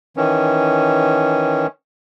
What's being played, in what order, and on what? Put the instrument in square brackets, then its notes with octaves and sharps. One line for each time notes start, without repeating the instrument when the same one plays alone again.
[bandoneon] D#3 E3 C#4